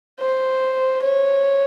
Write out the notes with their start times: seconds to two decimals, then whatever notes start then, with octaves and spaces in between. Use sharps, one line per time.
0.21 C5
1.03 C#5